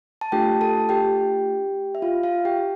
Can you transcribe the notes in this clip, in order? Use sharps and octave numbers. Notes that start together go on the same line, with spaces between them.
A5
A3 D4 F4 G4 A4 G5
A4 A5
G4 G5
E5
F4 F5
F4 F5
G4 G5